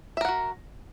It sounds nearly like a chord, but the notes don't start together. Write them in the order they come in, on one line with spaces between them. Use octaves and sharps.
E5 A#4 F#5 F#4